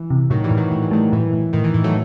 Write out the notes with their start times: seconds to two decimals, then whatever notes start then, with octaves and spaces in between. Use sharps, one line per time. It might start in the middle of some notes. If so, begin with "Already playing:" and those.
Already playing: E3
0.10 C3
0.30 A2 D#3 F#3
0.44 E3 G3
0.51 A2
0.57 D#3 F#3
0.71 A2 F#3
0.82 E3
0.91 D#3 F#3 A3
1.12 A2 E3
1.33 A2
1.53 A2 D#3
1.64 E3
1.74 A2 E3
1.84 F#3 A3